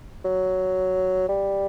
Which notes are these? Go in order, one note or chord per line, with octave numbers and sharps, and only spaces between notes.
F#3
G3